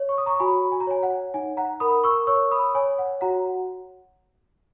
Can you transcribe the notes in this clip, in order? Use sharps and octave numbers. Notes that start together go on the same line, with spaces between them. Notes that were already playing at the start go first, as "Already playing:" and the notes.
Already playing: C#5
C#6
D#6
A#5 C#6
F#4 G#5 B5
G#5
A#5
C#5 G#5
F#5
D#4 G#5
F#5 A#5
A#4 B5 D#6
C#6 E6
C#5 C#6 E6
B5 D#6
C#5 G#5
F#5
F#4 F#5 A#5